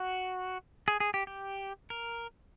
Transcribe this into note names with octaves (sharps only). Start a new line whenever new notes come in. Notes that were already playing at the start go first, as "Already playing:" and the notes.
Already playing: F#4
G#4
G#4
G4
G4
A#4